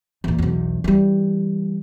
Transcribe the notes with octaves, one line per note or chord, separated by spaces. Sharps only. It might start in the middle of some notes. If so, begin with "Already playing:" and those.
E2 A#2
B1 E2
E3 G3